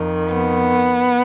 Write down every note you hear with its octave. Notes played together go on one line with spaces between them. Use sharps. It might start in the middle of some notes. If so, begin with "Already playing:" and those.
Already playing: F2 D#3
B3